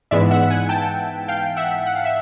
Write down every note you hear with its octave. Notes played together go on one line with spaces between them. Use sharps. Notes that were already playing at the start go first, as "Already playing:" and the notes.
G#2 E3 G#3 B3 D5 E5
E5 F#5
F#5 G#5
G5 A5
F5 G5
E5 F#5
F#5
F5
E5